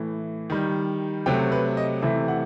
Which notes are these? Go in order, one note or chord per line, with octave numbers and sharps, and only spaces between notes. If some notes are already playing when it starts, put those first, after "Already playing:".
Already playing: A2 E3 A3
D#3 G3
C3 F#3 A3 G5
B4
D#5
C3 E3 A3 E5
F#5